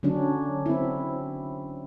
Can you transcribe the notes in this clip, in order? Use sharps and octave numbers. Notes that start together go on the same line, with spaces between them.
D3 F#3 C#4 D4
C4 E4